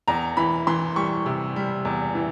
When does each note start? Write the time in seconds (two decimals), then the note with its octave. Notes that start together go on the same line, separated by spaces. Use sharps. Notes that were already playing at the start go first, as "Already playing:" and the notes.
0.08 E2 A#5
0.37 E3 B5
0.67 E3 C6
0.96 G3 C#6
1.26 C3
1.56 G3
1.85 E2
2.15 E3